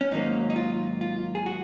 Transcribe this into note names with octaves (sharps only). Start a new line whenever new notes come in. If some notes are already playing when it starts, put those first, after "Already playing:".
C#4
G#2 D#3 F#3 A#3 D#4
D#4
F4
F4
G#4
F#4